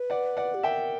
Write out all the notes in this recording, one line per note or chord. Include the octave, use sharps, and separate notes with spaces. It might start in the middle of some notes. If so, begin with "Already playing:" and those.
Already playing: B4
D5 F#5
D5 F#5
G4
A#4 E5 G5